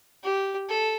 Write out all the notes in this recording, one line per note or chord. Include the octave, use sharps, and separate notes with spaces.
G4
A4